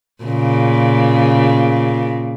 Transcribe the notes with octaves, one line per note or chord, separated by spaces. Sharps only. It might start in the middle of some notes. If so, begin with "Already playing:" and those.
A#2 C#3